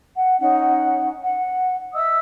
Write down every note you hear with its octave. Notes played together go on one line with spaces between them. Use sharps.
F#5
C#4 D#4 F#5
F#5
D#5 E5 D#6 E6